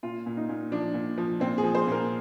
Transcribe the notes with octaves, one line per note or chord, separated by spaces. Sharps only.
A#2 F4
A#2
D#4
A#2
F3 D4
A#2
F3
A#2 C4
G#4
F3
C5
A#2 A#4